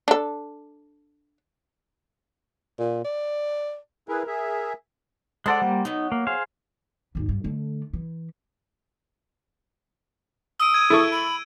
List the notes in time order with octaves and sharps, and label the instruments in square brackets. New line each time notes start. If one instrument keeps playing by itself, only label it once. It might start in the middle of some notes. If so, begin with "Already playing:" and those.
[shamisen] D4 A4
[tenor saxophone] A#2
D5
[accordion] E4 G#4 B4 [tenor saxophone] A#4
[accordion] G#4 E5
[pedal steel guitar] G#3 A4 D5 [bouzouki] C5 F#5
[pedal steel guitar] G3 A#3
[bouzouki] F#3 B3 [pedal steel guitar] D#4
[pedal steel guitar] A#3
G#4 C5 F5
[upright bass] G#1 D#2
G2
D3 A3
E3
[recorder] D#6 [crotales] E6 D7
[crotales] G#6 D#7
[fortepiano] E4 A4 C#6
[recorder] B5